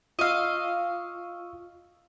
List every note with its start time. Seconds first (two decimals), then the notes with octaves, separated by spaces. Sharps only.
0.19 F4 D#5 F5 C#6 E6